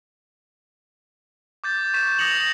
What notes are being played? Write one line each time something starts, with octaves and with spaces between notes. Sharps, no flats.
D6 G6 A6
C#6 G6 B6 E7
D#6 A#6 B6 C#7 F7 F#7
G6 A#6